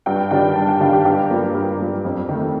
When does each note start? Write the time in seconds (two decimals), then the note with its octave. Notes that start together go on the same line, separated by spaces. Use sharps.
0.06 G2 G5
0.31 D#3 G3 D4 G5
0.56 G2 A5
0.69 G5
0.80 D#3 G3 D4 F5
0.93 G4
1.05 G2 G4
1.30 F3 A#3
1.55 G2
1.80 F3 A#3
2.05 F2
2.29 D#3 A3